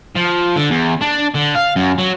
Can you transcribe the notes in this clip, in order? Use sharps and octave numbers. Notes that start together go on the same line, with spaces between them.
F3
D3
E2
D4
D3
F5
F#2
F#3